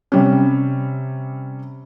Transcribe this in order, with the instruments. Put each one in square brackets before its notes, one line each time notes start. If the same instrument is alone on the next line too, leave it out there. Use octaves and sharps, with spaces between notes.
[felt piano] C3 G3 C#4